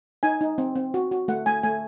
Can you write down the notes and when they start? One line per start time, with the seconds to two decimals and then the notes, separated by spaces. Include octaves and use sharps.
0.23 D#4 G#5
0.41 D#4
0.58 C4
0.75 C4
0.94 F#4
1.12 F#4
1.28 A3 F#5
1.46 A3 G#5
1.63 A3 G#5